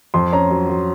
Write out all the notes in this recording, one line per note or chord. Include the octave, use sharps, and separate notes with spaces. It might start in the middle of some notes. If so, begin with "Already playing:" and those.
F2 C6
C#4 A#5
F#3
F#3